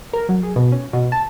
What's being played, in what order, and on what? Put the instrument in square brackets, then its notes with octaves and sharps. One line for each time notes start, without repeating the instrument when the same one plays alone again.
[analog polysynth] A#4
F#3
G#4
B2
C#4
B2
A5